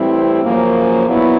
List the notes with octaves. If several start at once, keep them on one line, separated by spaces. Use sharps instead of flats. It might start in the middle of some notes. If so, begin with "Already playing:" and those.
Already playing: A2 E3 G3 C4 E4
F#2 C#3 F3 A#3
A#2 F#3 B3 E4